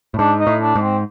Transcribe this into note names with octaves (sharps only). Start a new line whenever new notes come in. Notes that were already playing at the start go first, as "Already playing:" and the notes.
A2
G#2 D4
D#4
A2
D4
G#2
C4